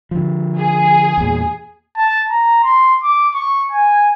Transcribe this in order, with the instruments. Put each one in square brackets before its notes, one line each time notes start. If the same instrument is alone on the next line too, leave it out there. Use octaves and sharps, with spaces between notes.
[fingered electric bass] D3 F3
[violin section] G#4
[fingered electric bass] E2 A#2
[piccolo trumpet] A5
A#5
C6
D6
C#6
G#5